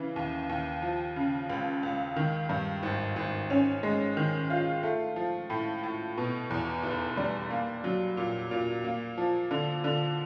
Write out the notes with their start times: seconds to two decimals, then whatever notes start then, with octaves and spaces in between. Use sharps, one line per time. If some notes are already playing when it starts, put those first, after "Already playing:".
Already playing: C#3 E3
0.16 D#2
0.49 D#2
0.82 F3
1.16 C#3
1.50 C#2
1.83 C#2
2.16 D#3
2.49 G2
2.83 G#1
3.16 G#1
3.50 C#4
3.83 G#3
4.17 D#3
4.50 F4
4.83 A3
5.16 F3
5.50 A2
5.83 A2
6.17 B2
6.50 E2
6.84 F1
7.17 G3
7.50 A#3
7.84 F#3
8.17 A#2
8.51 A#2
8.84 A#3
9.18 F3
9.51 D3
9.84 D3